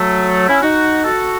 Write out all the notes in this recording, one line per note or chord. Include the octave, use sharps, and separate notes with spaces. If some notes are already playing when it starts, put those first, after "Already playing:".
Already playing: F#3 A3
C#4 E4
D#4 F#4
F#4 A4